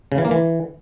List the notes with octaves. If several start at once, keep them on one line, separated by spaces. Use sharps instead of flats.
C#3
E3
A#3
E3